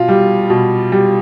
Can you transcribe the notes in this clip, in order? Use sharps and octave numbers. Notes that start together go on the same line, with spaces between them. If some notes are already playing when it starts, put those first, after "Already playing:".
Already playing: B2 F4
G3
B2
G3